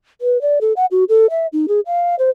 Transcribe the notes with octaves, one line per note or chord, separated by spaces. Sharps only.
B4
D5
A4
F#5
F#4
A4
E5
D#4
G#4
F5
C5